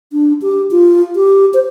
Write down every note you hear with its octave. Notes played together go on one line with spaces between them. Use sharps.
D4
G4
F4
G4
C5